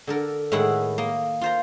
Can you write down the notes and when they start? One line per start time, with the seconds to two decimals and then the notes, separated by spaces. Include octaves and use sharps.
0.07 D3 A4 A#4
0.52 A2 D#3 G#3 E4 F#5
0.98 A#3 D#5
1.41 F4 C5 A#5